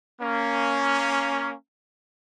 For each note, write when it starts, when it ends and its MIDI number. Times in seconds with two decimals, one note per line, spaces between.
0.21 1.53 58
0.21 1.53 61